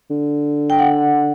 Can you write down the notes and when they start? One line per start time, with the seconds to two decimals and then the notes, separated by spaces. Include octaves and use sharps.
0.10 D3
0.70 G5
0.79 F#5